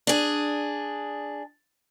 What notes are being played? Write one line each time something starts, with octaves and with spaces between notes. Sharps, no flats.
D4 G#4